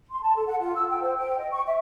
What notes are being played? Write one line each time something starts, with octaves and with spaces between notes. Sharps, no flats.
C6
A5
A4
F#5
F4
E6
G5
C5
G5
D#5
C#6
E5